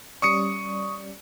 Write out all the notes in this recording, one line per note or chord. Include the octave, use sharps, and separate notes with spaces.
G3 C#4 D5 C#6 D#6 C#7